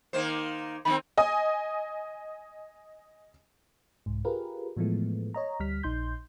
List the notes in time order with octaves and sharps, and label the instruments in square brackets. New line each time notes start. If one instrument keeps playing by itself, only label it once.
[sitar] D#3 A#3 C5
[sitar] D#3 A3 C4 [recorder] B5
[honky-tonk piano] D#5 G#5 D#6
[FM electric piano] C2 G#2
F4 G4 G#4 A#4 B4
A2 E3 F3 G#3 A3 B3
C#5 D#5 A#5
D2 G3 F6 B6
A#1 D#4 C6 G6